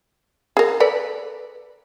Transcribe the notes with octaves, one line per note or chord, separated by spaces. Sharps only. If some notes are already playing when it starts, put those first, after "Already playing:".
G#4 A#4
A4 B4 D5